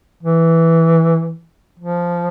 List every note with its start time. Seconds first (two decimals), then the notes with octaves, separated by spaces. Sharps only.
0.23 E3
1.80 F3